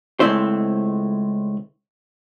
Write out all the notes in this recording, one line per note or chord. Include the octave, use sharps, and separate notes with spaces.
C#2 G#3 A3 C4 E4 C5